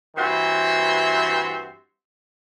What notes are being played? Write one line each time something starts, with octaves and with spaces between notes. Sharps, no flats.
G2 E3 C4 F#4 E5 C6